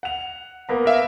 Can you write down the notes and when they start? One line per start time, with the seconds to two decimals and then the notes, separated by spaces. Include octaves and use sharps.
0.03 F#5 F7
0.69 A#3 B3 A#5
0.86 A#4 E5 F5